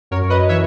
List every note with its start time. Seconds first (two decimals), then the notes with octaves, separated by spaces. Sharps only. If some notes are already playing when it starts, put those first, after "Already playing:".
0.11 F#2 A#4 C#5
0.30 B4 D#5
0.49 E3 C#5 E5